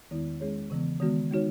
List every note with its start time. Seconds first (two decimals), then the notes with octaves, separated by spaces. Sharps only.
0.11 E2 D#3 G#3 B3 E4
0.40 G#3 C#4 G#4 C#5
0.70 C#3 E3 B3
1.00 D#3 G#3 B3 F#4
1.31 G#3 D#4 F#4 C#5